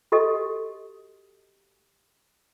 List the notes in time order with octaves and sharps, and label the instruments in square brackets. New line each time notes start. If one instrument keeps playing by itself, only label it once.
[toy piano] F#4 G4 A4 D#5